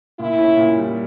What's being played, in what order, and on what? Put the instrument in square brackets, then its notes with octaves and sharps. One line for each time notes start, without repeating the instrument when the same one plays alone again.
[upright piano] A#2 [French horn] E4
[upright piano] C#4
A#2
G3